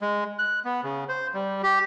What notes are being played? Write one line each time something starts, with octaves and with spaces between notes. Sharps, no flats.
G#3
F#6
B3
C#3
C5
G3
G4